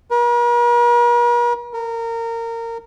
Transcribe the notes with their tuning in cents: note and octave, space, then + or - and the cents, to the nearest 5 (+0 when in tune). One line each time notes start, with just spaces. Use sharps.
A#4 +45
A#4 -25